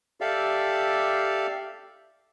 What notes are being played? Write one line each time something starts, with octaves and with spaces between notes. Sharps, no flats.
G4 A4 D5 E5 F5